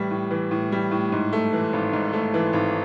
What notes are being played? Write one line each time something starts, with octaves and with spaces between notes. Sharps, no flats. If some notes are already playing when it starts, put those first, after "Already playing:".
Already playing: A2 E3 G3
A2
E3
A2
G3
A2
G#2
A3
E3
G#1
G#2
A3
E3
G#1